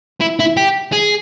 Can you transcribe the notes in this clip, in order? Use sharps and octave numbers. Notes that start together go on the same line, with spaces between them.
E4
E4
G4
G#4